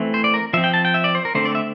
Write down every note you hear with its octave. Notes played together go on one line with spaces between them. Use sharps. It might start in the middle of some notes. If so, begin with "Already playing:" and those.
Already playing: E3 A3 C4
C5
D5
A#4
F3 C4 E5
G5
A5
G5
E5
D5
C5
A#4
D3 A3 C4 C5
D5
E5